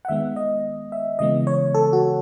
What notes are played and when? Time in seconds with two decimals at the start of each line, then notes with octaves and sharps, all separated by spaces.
0.05 F#5
0.09 D#3 G#3 B3 E5
0.36 D#5
0.92 E5
1.19 C#3 E3 G#3 B3 D#5
1.47 C#5
1.75 A4
1.93 F#4